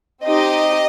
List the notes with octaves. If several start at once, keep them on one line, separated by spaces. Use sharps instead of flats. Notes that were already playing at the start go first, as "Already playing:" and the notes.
C4 D#4 G4 D#5